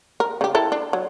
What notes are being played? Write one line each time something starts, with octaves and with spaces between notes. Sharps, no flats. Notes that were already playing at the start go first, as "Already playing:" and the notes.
A#4
C#3 G4
E4 A4 A#4
D4
F#3